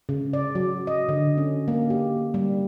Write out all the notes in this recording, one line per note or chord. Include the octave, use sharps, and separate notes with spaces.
C#3
D5
F#3
D#5
D3
C#4
A#3
G4
G3